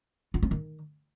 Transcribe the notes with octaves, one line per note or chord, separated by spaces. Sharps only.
F4
C4
D#3